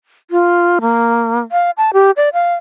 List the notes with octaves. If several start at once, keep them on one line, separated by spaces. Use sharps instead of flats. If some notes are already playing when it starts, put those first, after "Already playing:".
F4
A#3
F5
A5
G4
D5
F5